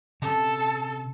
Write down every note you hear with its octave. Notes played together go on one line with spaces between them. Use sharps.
C3 C#4 A4